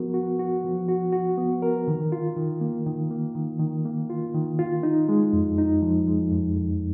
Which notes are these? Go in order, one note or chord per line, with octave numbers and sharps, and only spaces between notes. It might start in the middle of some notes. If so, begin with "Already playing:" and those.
Already playing: F3 B3 F#4 A#4
F#4
F#4
F3
F#4
F#4
B3
A#4
D#3
F4
D#3
A#3
D#3
A#3
D#3
D#3
A#3
F4
D#3
F4
D#4
G#3
F2
D#4
F3
G#3
F2
F2